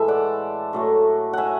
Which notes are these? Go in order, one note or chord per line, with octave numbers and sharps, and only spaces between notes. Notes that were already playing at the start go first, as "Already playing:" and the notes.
Already playing: A2 E3 G#3 A4 E5
D5 F#5
A2 F#3 A3
E5 F#5 G#5